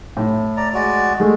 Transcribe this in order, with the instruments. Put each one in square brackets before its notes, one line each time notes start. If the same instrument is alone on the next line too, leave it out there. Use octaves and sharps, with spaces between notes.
[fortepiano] A2
[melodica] D5 A#5
G#3 F#4 D5
[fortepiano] G#3 A3